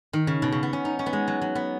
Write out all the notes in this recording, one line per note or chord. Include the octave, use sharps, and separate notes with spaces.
D#3
C#3
B2
C#3
B3
C#4
D#4
C#4
B3
G#3
F#3
F#3
B3